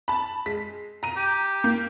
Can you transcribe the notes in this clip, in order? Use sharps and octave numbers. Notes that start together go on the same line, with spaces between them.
A5 B5
G#3 B6
A#5 D#7
G4
A#3